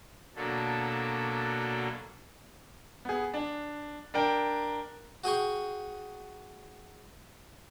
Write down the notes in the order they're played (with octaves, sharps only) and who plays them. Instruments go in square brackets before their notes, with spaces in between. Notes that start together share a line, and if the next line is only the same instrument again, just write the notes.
[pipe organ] B2 D3 F#3 A#3 D4 A4
[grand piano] B3 G#4
D4
D4 A#4 G5
[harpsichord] F#4 G#4 G5 C#6